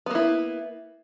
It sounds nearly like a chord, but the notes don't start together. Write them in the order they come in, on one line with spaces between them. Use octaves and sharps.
B3 A#3 E4